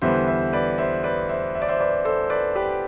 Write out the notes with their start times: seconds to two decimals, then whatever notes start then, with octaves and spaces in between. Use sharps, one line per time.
0.02 E2 D3 G3 B3 C5 E5
0.27 C5 E5
0.53 B4 D5
0.78 C5 E5
1.04 B4 D5
1.29 C5 E5
1.55 E5
1.62 D5
1.68 C5 E5
1.80 B4 D5
2.05 A4 C5
2.30 B4 D5
2.55 G4 B4